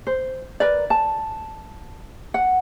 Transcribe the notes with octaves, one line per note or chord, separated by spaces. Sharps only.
C5
A#4 B4 D5
A5
F#5